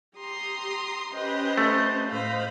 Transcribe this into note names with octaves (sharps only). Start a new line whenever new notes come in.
G4 A#5 C6 D#6
C#4 G4 B4 C5 D#5
A3
A2 C5 D#5 F5 B5